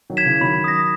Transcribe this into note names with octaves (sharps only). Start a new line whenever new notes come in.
D#3 F#3
G#6 B6 E7
C#3 E3
D#3 F#3 B5
D#6 A#6